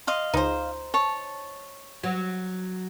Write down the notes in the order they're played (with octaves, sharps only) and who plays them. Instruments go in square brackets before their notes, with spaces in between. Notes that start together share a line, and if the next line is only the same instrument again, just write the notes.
[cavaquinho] D#5 F5 C6
[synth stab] C#2 [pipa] D#4 C5
[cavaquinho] C#5 A5
[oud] F#3